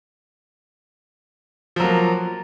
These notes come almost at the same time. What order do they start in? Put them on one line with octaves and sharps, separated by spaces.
F3 F#3 A#3